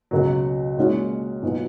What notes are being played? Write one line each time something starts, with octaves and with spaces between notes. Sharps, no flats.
C#2 B2 F#3
A#2 G#3 C#4 F#4
B1 B2 F#3 B3 F4